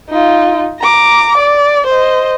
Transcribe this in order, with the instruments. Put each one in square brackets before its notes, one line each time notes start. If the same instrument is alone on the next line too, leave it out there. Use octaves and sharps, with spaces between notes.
[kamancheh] D#4 F4
A#5 D6
D5
C5 D#5